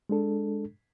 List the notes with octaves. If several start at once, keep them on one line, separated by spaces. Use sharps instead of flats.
G#3 D4 A4